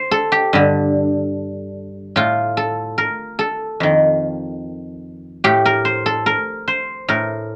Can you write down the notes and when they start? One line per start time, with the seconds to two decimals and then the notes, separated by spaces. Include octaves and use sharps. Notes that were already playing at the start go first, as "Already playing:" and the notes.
Already playing: C5
0.11 A4
0.32 G4
0.53 G2 D3
2.16 A2 F4
2.57 A4
2.98 A#4
3.39 A4
3.80 F2 D#3
5.44 A2 G4
5.66 A#4
5.85 C5
6.06 A4
6.26 A#4
6.68 C5
7.08 A2 A#4